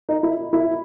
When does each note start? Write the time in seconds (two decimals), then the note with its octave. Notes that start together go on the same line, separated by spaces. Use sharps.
0.09 D#4
0.23 E4
0.53 E4